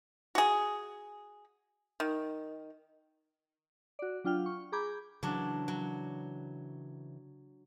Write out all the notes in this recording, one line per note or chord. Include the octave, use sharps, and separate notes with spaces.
F#4 G#4
D#3
F#4 D5
F#3 D4 F4 G5 F6
C#6
G#4 A#5 B5 D6 G6 G#6
C#3 E3 F#3 D4
F#3